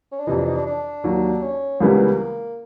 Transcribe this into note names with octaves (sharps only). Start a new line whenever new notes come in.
C#4
D4
F2 C3 E3 D#4
D4
D#4
D4
D4
D#2 D#3 F#3
C#4
C#2 C#3 E3 G3 A#3 B3